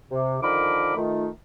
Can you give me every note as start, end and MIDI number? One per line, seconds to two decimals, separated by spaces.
0.10 0.37 48
0.42 0.95 50
0.42 0.95 51
0.42 0.95 53
0.42 0.95 70
0.42 0.95 83
0.42 0.95 86
0.96 1.28 51
0.96 1.28 57
0.96 1.28 65